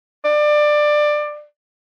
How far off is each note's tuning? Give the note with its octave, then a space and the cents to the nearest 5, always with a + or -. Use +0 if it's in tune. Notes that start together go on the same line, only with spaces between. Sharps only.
D5 +20